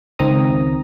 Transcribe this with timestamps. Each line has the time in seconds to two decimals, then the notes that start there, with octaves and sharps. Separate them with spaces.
0.19 C#2 D#3 C4 A#5 D#6